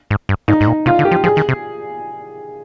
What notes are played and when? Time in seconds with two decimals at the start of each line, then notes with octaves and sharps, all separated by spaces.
0.10 G#2
0.29 G2
0.48 G#2 D#4
0.61 G#2
0.67 A#2
0.86 C3 F4
0.99 D3
1.05 G4
1.11 F3
1.24 F3 G#4
1.37 D#3
1.49 C3